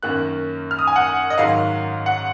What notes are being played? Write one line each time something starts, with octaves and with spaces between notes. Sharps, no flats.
F#2 D#3 A#3 C#4 F#6
F6
D#6
G#5
F#5
D#5
G#2 D#3 F#3 F5
F#5